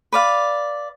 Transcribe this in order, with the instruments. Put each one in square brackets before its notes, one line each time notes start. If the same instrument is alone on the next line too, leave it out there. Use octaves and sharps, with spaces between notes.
[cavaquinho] B4 D5 F5